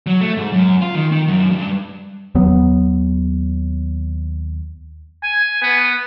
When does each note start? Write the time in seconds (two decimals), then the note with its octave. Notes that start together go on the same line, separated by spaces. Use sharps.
0.06 F#3
0.21 A3
0.37 G#2
0.52 F#2
0.82 F4
0.95 D#3
1.12 D#3
1.28 F#2
1.51 G2
2.35 D#2 F#3 B3
5.23 G#5
5.62 B3